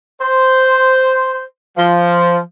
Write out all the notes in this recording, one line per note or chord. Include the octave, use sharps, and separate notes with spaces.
C5
F3